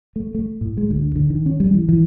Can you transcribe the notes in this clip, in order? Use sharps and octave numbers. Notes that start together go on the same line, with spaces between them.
A3
A3
A2
G#3
D2
D3
D#3
C#4
G3
E3
E3